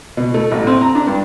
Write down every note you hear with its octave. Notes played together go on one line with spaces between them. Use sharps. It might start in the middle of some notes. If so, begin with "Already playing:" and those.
B2
A3
A1
C4
A#5
D4
G2